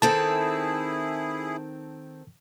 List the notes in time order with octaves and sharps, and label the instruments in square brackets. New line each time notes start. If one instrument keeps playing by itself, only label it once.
[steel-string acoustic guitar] D#3 C4 A4 [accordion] E4 G#4 [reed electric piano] A5